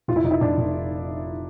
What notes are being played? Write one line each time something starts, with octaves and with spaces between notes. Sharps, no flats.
F1 F4
E4
F1 D#4
E4
F1 D4
F1